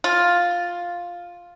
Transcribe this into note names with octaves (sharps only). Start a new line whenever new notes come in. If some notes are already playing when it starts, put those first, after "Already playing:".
F4